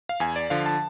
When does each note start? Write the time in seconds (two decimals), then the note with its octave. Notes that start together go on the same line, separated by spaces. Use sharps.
0.09 F5
0.20 E2 G#5
0.36 D5
0.50 D3 F3 F5
0.66 A5